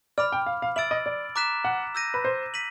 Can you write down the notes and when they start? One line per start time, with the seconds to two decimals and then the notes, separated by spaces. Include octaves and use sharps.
0.18 D5 B5 D6 F6
0.32 G5
0.46 F5
0.62 F5
0.76 E5 E6 A6 D7 F#7
0.91 D#5
1.06 D5
1.36 A#5 D6 F#6 B6 E7
1.65 F#5
1.95 E6 G6 A#6 D#7
2.14 B4
2.24 C5
2.54 B6 D#7 F#7